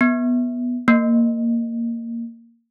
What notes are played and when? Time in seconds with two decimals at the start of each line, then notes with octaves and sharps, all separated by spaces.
0.01 B3
0.88 A#3